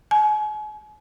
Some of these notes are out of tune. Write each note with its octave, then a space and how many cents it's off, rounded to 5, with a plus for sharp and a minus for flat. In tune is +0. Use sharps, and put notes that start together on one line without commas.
G#5 +40